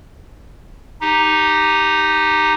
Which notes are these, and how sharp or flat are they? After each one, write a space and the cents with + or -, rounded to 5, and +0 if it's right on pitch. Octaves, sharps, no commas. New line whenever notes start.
D#4 -5 G4 +0